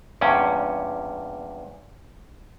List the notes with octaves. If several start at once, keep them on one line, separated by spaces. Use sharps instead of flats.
E2 G2 A#2 C#4